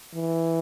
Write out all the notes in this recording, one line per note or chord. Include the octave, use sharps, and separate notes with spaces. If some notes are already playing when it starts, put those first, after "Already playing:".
E3